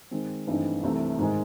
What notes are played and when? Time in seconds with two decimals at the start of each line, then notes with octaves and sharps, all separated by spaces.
0.11 D#3 G#3 C4
0.47 G2 E3 A3 C4 D#4
0.83 C2 C3 E3 A3
1.18 G#2 D#3 G#3